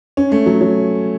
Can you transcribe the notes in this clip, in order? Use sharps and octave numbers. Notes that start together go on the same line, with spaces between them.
C#4
A3
F#3
F#3